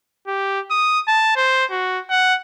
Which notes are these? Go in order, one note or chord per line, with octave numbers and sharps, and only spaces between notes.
G4
D#6
A5
C5
F#4
F#5